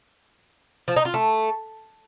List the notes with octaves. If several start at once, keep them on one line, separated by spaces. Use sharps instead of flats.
F3
D#4
F4
A3